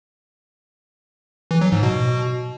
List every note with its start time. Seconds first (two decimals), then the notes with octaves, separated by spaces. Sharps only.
1.51 E3
1.61 F#3
1.72 G#2
1.83 B2